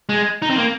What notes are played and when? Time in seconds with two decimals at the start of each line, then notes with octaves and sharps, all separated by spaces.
0.09 G#3
0.42 D#4
0.50 C4
0.57 A#3